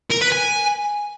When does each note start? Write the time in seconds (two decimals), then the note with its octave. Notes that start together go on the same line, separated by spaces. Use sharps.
0.10 A#4
0.21 B4
0.32 G#5